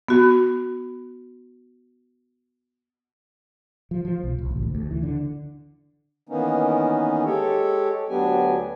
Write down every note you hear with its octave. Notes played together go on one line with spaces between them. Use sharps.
B3 F#4
F3
F3
B1
C2
A1
D2
D2
E3
D3
D#3 E3 A#3 B3 C#4 D#4
G#3 G4 A4 C#5
D2 F#3 B3 D4 G4 G#5